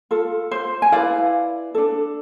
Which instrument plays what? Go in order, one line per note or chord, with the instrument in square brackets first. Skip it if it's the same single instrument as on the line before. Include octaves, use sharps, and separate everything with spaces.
[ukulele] F4 A4
C5
G#5
E4 B4 D5 F5
D4 A4